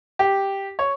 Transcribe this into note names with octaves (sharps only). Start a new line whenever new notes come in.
G4
C#5